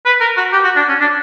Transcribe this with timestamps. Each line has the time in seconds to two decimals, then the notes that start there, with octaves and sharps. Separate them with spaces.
0.06 B4
0.21 A#4
0.37 F#4
0.53 G4
0.64 F#4
0.76 D4
0.88 C#4
1.00 D4